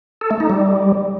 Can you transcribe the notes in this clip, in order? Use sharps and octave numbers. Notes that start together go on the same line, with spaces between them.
A4
A3
D#4
G3